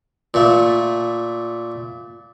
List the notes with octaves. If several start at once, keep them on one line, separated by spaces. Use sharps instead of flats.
A#2 A3